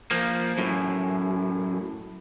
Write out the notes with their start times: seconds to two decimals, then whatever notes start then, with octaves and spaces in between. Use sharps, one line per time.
0.11 F3 A#3
0.58 F#2 A2